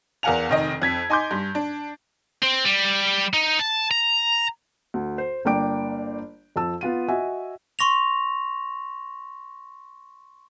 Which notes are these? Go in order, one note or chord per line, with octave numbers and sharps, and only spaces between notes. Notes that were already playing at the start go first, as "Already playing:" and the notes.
E2 A#4 F5 F#5 G#5 F7
F1 D#3 D#5
F2 G#6 B6
D#4 G#5 C6 D6 G6
G2
D4
C4
G3
D#4
A5
A#5
D2
C5
G1 A#3 D4 G5 D6 D7
F2 F3 A5 E6
B3 F4 D#7
F#4 D#5 E5 G#5
C6 C#6 A#6 F7